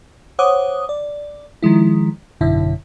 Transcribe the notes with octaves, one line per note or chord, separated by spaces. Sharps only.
C5 C#5 F#5 D6 D#6
D5
D#3 F3 G#3 E4
G#1 F#2 B2 D3 E4 E5